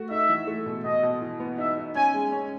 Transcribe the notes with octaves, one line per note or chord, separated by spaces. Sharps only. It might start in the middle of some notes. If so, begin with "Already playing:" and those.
Already playing: A3 F#4
D#4 E5
E3
A3
B2
B2 D#5
B2
E3
B3
D#4 E5
D#4
C#4 G#5
G#3
C#4